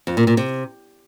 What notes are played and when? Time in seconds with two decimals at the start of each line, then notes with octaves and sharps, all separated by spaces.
0.07 F2
0.17 A#2
0.27 A#2
0.37 C3